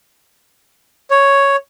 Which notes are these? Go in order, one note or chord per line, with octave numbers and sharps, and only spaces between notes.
C#5